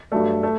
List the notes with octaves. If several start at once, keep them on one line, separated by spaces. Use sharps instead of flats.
G2 F#3 A3
A3